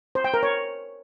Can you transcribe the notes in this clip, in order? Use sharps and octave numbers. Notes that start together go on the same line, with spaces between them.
C5
G5
A#4
C#5